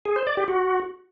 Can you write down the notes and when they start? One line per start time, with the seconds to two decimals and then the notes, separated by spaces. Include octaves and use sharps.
0.05 G#4
0.16 C5
0.27 D5
0.37 G4
0.48 F#4